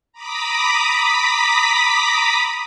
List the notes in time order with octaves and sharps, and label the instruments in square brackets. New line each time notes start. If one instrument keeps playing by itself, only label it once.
[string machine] A#5 B5 D6 D#6 B6